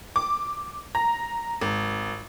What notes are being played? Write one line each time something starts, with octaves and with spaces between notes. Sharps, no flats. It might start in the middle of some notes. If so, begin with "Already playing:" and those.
D6
A#5
G#1